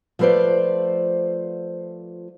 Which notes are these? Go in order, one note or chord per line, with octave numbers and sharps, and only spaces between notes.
F3 A3 F4 B4 C5 D5